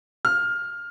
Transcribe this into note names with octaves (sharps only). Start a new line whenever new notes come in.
F6